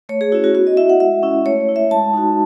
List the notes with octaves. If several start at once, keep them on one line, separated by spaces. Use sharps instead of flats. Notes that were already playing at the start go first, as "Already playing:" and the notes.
A3 C#5
G#4
C#4 E4 F#4
F#4
B3 F#4
D#5
E4 E5
F#5
G#3 E5
C#4 E4
A3 C#5
E4
E5
G#3 A5
D#4 F#4